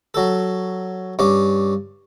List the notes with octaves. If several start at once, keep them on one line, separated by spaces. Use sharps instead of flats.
F#3 A4
G2 C#4 D6